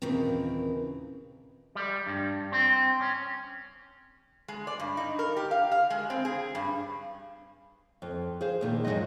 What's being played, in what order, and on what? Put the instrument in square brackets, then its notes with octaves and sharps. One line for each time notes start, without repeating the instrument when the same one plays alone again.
[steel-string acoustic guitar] D#2 A#2 C#3 E3 C4
[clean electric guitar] G3
G2
C4
C#4
[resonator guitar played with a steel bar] G#3
D5
G2
D#4
A#4
G4
F5
F5
G#3
C4
G#4
G2
[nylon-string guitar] F2
G#4 C5 F5
E2 A#2 D#3
G#2 F3 F#3 D#5